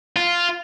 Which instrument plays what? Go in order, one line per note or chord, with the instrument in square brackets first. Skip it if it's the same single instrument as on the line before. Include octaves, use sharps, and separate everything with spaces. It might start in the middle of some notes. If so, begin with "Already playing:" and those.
[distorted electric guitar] F4